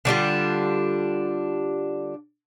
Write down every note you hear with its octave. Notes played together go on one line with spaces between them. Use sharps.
D3 G3 D4 F4